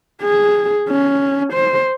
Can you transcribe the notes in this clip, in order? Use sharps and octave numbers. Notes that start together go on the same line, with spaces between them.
G#4
C#4
C5